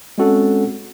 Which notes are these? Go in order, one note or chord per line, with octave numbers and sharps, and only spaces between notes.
G#3 C4 C#4 F#4 A4 F#5